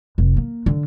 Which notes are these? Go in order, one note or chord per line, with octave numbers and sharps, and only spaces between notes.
F1
A#3
D3